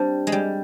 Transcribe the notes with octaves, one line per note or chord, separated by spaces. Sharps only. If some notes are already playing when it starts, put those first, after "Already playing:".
Already playing: G3 C4 D4
G#3
G3